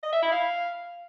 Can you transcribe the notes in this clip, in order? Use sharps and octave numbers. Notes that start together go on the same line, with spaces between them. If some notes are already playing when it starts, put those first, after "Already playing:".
D#5
E5
E4
F5